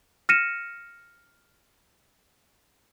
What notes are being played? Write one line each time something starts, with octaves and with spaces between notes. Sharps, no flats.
F6 A#6 C#7 D#7 E7